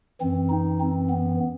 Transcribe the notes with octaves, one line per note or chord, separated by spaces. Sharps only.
F#2 E3 C4
D#4
C4
B3